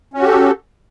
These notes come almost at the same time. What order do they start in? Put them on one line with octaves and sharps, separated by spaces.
C#4 F#4 G4 A4